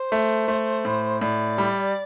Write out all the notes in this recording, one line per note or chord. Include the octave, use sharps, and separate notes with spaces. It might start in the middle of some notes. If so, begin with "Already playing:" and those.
Already playing: C5
A3
A3
A2
A2 D5
G3